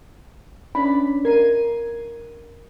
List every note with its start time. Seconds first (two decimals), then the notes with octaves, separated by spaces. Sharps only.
0.75 C#4 D4 D5 B5
1.25 A#4 G#6 C7 D#7